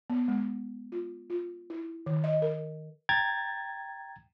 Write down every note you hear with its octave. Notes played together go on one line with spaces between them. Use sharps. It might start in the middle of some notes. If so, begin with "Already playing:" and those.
B3
G#3
F4
F4
E4
D#3
D#5
A#4
G5 A#5 G#6 A6